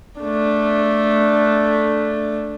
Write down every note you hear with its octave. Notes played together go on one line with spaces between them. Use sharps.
A3 D4